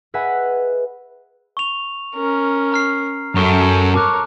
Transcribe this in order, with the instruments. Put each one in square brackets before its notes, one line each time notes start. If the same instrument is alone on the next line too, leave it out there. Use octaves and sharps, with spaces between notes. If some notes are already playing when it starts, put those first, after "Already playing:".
[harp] G#4 B4 D#5 E5 F#5 G#5
[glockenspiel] C#6 F7
[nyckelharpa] C#4 A#4
[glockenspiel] A#5 F6 C7
[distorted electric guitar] F#2 [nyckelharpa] A4 [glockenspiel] A#5 C#6 D7
[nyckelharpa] A#4 C#5 [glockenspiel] A5 D6 F#6